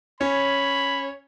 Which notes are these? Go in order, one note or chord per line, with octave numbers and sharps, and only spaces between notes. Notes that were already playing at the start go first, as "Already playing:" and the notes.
C#4 C#5 B5